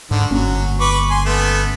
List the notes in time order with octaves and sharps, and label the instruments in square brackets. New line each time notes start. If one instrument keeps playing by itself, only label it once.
[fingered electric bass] G#2 [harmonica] D3 D#3
[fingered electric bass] G1 A#3 C#4 [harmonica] F#3
[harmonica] B4 C#6 D6
G#5 C6
A3 B3